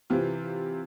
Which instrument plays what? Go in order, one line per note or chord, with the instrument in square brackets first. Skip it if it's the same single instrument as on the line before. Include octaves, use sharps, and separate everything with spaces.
[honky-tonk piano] C3 E3 C4 F4